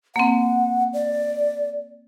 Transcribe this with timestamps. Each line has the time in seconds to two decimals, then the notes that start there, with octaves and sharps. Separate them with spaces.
0.16 A#3 C4 F#5
0.94 D5